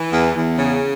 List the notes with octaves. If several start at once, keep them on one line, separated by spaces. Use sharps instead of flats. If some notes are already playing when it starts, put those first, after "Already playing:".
Already playing: E3
E2
E2
C#3